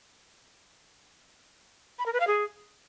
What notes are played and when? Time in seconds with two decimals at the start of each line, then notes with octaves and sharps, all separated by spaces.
1.99 B5
2.06 A#4
2.13 B4
2.20 F5
2.27 G#4